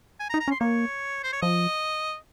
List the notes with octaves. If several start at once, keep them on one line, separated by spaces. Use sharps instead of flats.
G#5
A#5
D#4
A#5
C#4
C6
A#3 C#5
C5
C#5
F3 D#5